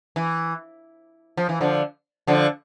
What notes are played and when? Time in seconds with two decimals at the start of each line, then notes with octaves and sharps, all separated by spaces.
0.16 E3
1.37 F3
1.49 E3
1.61 D3 F3
2.27 D3 F3